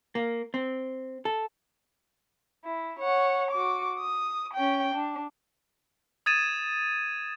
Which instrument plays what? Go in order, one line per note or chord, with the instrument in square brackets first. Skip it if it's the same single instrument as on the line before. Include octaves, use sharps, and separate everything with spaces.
[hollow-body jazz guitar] A#3
C4
A4
[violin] E4
C#5 F#5
F#4 D6
D#6
C#4 G5
D4
[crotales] D#6 G#6 A6 D#7 E7